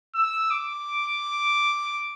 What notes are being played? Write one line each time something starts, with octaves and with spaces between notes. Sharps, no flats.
E6
D6